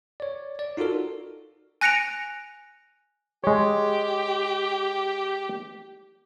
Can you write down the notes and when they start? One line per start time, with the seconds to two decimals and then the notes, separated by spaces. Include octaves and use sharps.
0.20 C#5 D5
0.59 D5
0.77 D#4 F4 F#4 A4 A#4
1.81 G#5 F#6 A#6 C#7 D7 F7
3.44 G#3 G4 C#5